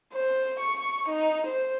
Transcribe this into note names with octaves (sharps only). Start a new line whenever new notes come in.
C5
C#6
D#4
C5